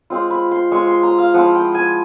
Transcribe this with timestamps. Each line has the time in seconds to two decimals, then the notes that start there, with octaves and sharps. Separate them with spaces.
0.10 G#3 C4 F4
0.31 B5
0.51 C6
0.71 G#3 C4 F4 C#6
0.87 C6
1.03 A#5
1.18 F5
1.34 F3 G#3 C4 E4 F#5
1.55 G5
1.75 G#5